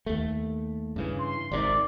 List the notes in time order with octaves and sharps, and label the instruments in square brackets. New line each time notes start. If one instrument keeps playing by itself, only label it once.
[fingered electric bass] D#2 A3
G2 C#3 E3
[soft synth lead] C6
[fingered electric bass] G#1 C3 D#3 [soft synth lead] D5